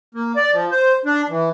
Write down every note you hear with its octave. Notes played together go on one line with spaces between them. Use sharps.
A#3
D5
F3
C5
D4
E3